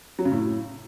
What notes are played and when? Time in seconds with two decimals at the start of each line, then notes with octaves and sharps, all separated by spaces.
0.19 F#3
0.25 C#3
0.32 A2